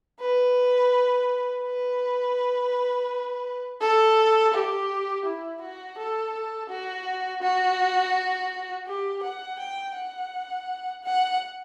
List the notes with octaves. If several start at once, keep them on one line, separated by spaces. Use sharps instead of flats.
B4
B4
A4
G4
E4
F#4
A4
F#4
F#4
G4
F#5
G5
F#5
F#5